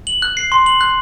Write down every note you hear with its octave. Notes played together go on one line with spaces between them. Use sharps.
F#7
F#6
C7
C6
F#7
F#6